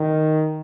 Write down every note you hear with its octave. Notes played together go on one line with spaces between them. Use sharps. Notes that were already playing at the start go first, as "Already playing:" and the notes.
Already playing: D#3